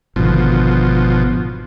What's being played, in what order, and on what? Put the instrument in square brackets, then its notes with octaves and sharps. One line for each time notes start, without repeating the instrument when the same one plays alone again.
[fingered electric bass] G#1 D3 [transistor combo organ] B2 F3